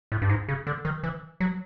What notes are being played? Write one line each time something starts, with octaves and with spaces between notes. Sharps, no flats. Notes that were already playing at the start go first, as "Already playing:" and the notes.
A2
G2
G#2
C#3
D3
D#3
E3
F#3